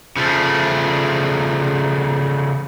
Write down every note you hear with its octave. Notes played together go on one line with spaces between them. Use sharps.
C#3 F3 A3